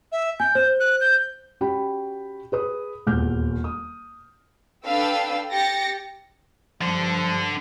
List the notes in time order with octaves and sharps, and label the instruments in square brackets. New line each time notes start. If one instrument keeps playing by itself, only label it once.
[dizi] E5
[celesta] G#5 [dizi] G6
[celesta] C5
[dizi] F#6
G6
[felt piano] C#4 F#4 G4 G5 B5
G#4 B4 D#6
D#1 E2 D6 F6 G6
D#6
[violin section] D4 A4 B4 F5 G5 E6
G4 G5 A6 A#6 C#7
[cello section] G2 G3 [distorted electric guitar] D3 [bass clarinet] F3